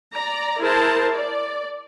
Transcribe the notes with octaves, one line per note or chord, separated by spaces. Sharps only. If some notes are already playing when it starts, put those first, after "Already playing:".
D5 A#5
E4 G#4 A#4 C5 A5
D5